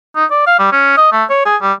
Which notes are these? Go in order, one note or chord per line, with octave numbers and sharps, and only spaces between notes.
D#4
D5
F5
G3
C#4
D#5
A3
C#5
G#4
G3